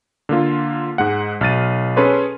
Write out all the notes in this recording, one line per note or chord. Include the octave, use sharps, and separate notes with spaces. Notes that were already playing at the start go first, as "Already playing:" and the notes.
D3 A#3 F4
G#2 G#3 F#5
B1 F6 A6 D#7
C#4 G#4 A4 B4 C#5 C6